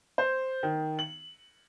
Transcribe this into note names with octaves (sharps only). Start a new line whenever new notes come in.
C5
D#3
F#7